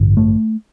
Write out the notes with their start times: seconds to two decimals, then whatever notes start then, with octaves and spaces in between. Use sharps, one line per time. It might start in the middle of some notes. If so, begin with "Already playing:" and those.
Already playing: A1 G2 D3
0.17 A3